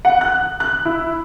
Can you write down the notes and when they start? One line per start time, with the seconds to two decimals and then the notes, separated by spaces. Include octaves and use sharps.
0.05 F#5
0.21 F#6
0.60 F#6
0.85 E4